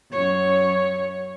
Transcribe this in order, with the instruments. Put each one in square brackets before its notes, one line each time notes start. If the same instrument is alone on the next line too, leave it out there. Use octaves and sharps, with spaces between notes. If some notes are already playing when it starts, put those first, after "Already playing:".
[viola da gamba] F#2 C#5